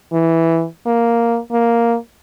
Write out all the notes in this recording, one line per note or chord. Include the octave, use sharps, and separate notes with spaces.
E3
A#3
A#3